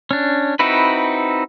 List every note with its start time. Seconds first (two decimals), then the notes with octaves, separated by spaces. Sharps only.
0.11 C#4 D4
0.59 C4 D#4 E4 F#4 B4